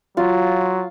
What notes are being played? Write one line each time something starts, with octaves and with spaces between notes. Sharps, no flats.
F#3 F4